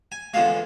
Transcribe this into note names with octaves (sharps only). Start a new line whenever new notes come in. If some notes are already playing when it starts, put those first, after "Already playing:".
G#5
E2 D3 F3 G#3 F5